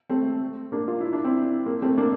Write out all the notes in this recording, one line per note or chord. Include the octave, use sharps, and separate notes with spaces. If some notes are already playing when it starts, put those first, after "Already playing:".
A3 C4
A#3 D4
F4
E4
D4
C4 E4
A#3
A3 C4
A#3 D4